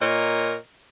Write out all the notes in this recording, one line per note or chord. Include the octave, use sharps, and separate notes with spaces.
A#2 A#4 C#5 D#5